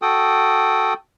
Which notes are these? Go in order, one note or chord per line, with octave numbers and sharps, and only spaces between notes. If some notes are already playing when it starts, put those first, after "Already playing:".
F#4 A4 G5 D#6